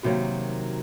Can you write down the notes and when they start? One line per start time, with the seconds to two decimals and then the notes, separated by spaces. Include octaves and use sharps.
0.03 C3 D#3 F#3 A#3 F#4